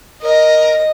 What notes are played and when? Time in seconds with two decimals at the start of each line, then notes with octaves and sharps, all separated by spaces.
0.22 A#4 D#5